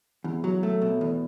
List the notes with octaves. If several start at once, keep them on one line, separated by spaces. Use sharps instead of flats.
E2
F#3
A3
B2
E2